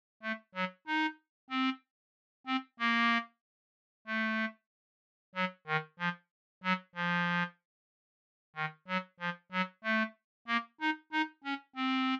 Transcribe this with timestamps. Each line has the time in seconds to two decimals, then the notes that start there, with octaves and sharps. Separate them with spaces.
0.23 A3
0.55 F#3
0.87 D#4
1.50 C4
2.47 C4
2.79 A#3
4.07 A3
5.35 F#3
5.67 D#3
5.99 F3
6.63 F#3
6.95 F3
8.56 D#3
8.88 F#3
9.20 F3
9.52 F#3
9.84 A3
10.47 A#3
10.81 D#4
11.12 D#4
11.44 C#4
11.76 C4